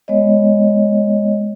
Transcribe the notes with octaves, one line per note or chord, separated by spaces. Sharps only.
G#3 B3 C#5 D#5